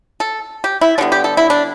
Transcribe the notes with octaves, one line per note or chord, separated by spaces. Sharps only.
A4
G4
E4
D3 G3 B3 D4
G4
A4
E4
D4